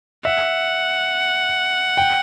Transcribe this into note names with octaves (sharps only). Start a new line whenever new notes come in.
E5 F#5
G5